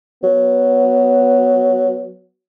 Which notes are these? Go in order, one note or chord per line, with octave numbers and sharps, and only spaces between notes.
F#3 B3